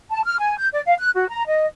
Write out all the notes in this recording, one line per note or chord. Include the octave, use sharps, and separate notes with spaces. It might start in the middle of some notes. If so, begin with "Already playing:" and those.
A5
F6
G#5
G6
D5
F5
F#6
F#4
A#5
D#5